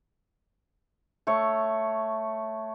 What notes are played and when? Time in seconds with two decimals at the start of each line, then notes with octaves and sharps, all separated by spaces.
1.27 A3 C#5